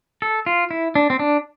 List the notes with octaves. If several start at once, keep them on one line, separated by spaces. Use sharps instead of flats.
A4
F4
E4
D4
C4
D4